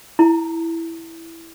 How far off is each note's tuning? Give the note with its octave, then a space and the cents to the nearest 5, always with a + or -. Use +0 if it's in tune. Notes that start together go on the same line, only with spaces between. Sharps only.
E4 +0 A#5 -45